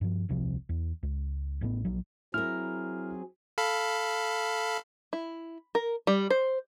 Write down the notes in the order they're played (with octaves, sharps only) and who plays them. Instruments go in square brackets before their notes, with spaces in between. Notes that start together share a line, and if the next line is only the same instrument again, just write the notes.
[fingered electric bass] G2 F3
D#1 C2 C3 F3
E2
C#2
A1 A2 C#3 B3
A#1 F#3
[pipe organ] F#3 C4 G#4 [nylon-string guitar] E4 A#4 [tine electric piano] F6
[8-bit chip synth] A4 F5 B5
[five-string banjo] E4
A#4
G3
C5